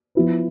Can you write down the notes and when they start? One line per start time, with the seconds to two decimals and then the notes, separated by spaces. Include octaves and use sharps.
0.15 F3 B3 E4 B4